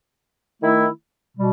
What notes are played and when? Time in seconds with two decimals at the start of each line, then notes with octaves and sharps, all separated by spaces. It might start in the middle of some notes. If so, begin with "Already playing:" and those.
0.61 D#3 A3 E4
1.37 B2 G3